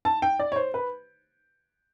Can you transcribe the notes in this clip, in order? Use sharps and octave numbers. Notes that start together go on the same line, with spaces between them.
A5
G5
D5
C#5
C5
B4